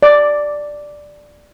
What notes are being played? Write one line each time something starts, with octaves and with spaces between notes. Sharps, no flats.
D5